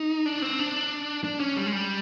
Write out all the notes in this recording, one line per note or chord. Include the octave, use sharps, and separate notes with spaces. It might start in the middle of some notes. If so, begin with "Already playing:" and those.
Already playing: D#4
D4
C4
D4
D4
C#4
G3
G#3
G3